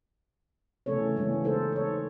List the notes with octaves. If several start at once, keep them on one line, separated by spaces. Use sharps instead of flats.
C#3 E3 A3 C#4 A4 C#5
E3 G#3 A#3 C#4 D4
D#4 A4 C5
A4 C#5